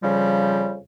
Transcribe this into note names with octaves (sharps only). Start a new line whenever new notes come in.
F2 C#3 F3 G3